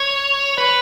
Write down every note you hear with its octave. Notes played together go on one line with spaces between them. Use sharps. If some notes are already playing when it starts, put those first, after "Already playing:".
Already playing: C#5
B4